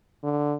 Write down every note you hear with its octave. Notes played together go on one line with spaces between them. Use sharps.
D3